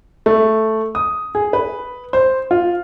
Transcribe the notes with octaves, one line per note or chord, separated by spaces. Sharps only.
A3
D#6
G#4
B4
C5
F4